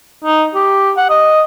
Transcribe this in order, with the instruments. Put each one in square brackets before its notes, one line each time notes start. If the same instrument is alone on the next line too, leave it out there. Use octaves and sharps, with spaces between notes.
[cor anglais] D#4
G4
F#5
D#5